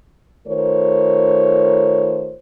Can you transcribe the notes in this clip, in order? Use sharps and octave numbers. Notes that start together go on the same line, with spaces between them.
D#3 A3 F4 A#4 C5 C#5